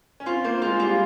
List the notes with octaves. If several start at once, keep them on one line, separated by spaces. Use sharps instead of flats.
C#4
C4 F4
A#3 C5
G#3 F4
G3 F4